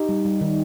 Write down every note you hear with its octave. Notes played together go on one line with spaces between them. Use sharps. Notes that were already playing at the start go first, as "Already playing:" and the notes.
Already playing: D#4 G4
G3
G3
D#3